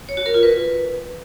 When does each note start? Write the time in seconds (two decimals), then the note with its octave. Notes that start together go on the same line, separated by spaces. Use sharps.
0.09 C#5
0.17 F#4
0.26 A#4
0.34 F4
0.43 B4